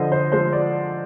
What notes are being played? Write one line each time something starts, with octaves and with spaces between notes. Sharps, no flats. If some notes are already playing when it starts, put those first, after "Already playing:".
Already playing: D3 F3 C5 D#5
C5
F3 G#3 C5
D5